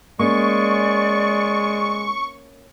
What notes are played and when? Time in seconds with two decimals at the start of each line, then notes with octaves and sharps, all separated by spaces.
0.19 G#3 A#3 C#4 D5 C#6